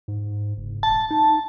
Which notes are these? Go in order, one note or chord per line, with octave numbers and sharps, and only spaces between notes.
G#2
F#1
D#1 A5
D#4